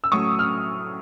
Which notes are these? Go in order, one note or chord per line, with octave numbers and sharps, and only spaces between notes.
E6
A2 F#3 A3 C#4 C#6 D#6
F6